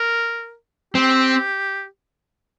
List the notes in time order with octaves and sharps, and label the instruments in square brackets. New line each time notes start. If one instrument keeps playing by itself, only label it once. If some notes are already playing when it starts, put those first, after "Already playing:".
Already playing: [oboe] A#4
[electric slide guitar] C4 [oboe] G4